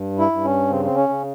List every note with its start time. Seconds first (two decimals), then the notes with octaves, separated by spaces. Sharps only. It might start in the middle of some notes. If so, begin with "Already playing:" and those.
Already playing: G2
0.19 E4
0.32 G2
0.44 C#4
0.70 C#3 C4
0.85 C4
0.96 C#4
1.09 C#3